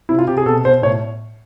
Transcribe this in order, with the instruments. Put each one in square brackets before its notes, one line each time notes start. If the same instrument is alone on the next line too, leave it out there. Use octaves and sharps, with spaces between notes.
[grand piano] C3 E4
F4
C3 G4
G#4
B2 A4
B2 C5
A2 C#5